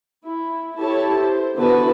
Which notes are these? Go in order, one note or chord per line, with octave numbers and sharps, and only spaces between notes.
E4
E4 G4 A4 C#5 A5
C5
D3 E3 B3 F#4 B4 A5